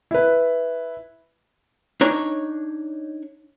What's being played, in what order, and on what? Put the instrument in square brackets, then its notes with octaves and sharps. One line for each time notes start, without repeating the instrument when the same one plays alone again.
[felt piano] E4 B4
[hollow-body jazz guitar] D4 D#4 C#5